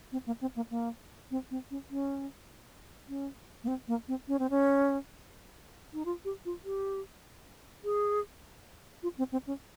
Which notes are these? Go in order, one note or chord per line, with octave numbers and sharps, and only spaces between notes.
C4
A#3
C4
A#3
A#3
C4
C4
C#4
C#4
C#4
A#3
C4
A#3
C4
C#4
C4
C#4
D#4
F4
G4
F4
G4
G#4
F4
C4
C4
C#4